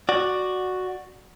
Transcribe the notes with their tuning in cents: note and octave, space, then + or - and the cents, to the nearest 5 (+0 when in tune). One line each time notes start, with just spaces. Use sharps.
F#4 +0 D5 +10